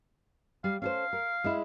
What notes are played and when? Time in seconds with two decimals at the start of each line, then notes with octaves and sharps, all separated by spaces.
0.64 G3 F5
0.82 C#4 A4 C5 F5
1.13 A#4
1.44 G#3 E4